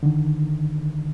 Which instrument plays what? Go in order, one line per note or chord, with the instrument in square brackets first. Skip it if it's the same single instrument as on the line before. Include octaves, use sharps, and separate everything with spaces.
[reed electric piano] D3 D#3